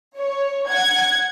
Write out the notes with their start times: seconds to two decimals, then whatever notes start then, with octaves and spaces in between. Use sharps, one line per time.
0.17 C#5
0.69 F#5 G#6